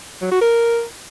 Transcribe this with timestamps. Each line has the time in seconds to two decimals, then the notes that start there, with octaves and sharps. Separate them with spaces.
0.22 F#3
0.32 F#4
0.41 A#4